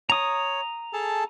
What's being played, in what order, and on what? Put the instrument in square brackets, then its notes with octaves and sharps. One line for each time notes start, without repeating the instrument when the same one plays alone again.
[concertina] C#5 [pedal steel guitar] A#5 D#6
[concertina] G#4 A4 A5